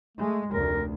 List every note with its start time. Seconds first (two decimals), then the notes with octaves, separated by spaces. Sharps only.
0.17 G#3 A3
0.51 F1 D2 A#4